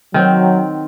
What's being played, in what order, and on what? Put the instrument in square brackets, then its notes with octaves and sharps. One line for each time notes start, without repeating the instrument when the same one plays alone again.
[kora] D#3 C4 [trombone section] F#3